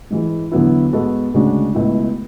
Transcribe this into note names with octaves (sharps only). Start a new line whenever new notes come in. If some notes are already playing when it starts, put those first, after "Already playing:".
G#2 E3 G#3
E2 D3 F#3 B3 E4
G#2 G#3 B3 F#4 A4
D2 C#3 G#3 D4 F#4
C#2 B2 A3 E4